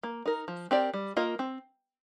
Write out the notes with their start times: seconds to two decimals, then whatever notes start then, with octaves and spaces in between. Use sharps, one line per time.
0.03 A#3
0.26 D#4 A#4
0.48 F3
0.71 C4 G4 A#4 D5
0.94 G3
1.16 A#3 F4 A#4 D#5
1.39 C4